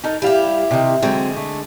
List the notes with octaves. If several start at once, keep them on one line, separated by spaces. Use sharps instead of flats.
D#4 A4 A#4
G3 E4 G4 F5
C3 D#3
D3 F#3 G#3 C4 E5
A3